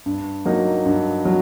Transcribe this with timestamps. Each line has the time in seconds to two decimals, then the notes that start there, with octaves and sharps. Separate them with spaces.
0.06 G2
0.45 F#3 A#3 D#4
0.85 G2
1.25 F#3